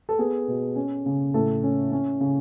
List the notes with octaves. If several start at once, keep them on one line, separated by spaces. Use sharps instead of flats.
A4
B3 G#4
B2
C#4
C#3
A2 A4
C#4
C#4
C#3